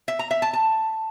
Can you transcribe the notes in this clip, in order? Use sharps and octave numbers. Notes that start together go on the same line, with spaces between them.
E5
A#5
E5
A5
A5